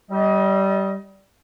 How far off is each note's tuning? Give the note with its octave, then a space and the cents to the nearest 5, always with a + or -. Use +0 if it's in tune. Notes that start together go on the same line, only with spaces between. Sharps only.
G3 -20 D#5 +25